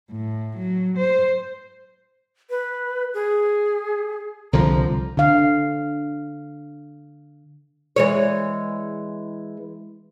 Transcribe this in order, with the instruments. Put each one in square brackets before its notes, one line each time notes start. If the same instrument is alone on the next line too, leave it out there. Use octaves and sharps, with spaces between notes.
[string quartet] A2
F#3
C5
[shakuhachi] B4
G#4
[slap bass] C2 D3 F3 [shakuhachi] A#5
[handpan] D3 F5
[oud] E3 G#3 C#5